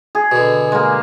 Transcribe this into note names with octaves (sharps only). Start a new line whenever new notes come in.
G#4
B2 D3
G#3 A#3